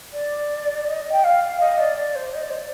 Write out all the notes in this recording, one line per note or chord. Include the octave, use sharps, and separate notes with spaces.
D5
D#5
G5
F5
D#5
D5
D5
C5
D#5
D5
C5
D5